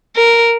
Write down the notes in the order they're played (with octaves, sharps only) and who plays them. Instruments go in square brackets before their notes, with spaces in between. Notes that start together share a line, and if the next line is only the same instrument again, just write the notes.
[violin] A#4